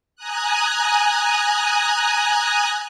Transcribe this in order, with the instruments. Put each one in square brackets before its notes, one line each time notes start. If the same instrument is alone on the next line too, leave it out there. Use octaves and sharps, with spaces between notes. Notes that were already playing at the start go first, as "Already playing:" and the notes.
[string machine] G#5 A#5 D#6 F#6